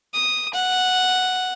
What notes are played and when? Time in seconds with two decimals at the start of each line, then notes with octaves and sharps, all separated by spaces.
0.14 D#6
0.54 F#5